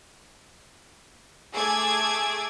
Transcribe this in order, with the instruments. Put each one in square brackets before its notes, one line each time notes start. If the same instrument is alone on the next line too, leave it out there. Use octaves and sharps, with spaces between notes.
[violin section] A3 G#4 D6 E6 G#6